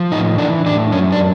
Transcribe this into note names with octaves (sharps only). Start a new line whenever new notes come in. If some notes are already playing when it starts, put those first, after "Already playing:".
Already playing: F3
A2 D#4
E3 D4
A2 D4
F#2 C#4
D4